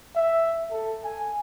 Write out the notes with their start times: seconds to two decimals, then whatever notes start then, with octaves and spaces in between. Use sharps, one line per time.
0.16 E5
0.71 A4
1.04 G#5